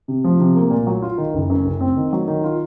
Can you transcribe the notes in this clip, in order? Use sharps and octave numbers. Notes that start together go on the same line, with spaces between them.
C3
F3
C3
A#3
A#2
F#3
F4
D#3
F#1
F#2
F#1
C4
D#3
F#3
D#3
F4